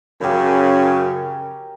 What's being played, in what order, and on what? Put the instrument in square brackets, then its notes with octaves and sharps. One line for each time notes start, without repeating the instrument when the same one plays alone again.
[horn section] F#2 C#3 [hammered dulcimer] G4 A#4